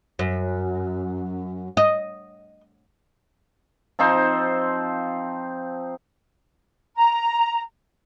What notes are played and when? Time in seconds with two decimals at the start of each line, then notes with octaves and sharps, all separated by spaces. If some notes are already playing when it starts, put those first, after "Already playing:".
0.19 F#2
1.77 D#5
3.99 F3 C4 D#4 C5
6.97 A#5